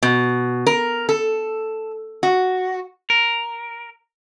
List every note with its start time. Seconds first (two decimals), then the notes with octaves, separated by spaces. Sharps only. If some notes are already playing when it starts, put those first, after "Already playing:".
0.03 B2
0.67 A#4
1.09 A4
2.23 F#4
3.10 A#4